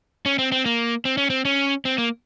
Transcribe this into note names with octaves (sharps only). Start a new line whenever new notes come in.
C#4
C4
C4
A#3
C4
C#4
C4
C#4
C4
A#3